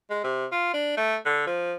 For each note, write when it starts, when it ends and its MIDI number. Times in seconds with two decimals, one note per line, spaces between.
0.10 0.23 56
0.24 0.45 48
0.52 0.72 65
0.74 0.97 62
0.97 1.16 57
1.25 1.45 50
1.46 1.75 53